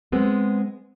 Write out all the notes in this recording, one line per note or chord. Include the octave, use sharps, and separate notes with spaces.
G#3 B3 C4